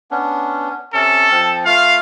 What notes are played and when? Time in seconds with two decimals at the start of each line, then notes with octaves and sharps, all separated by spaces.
0.11 B3 C#4 D4
0.94 C3 C#4 A4
1.31 F3 C4
1.65 A3 F4 F5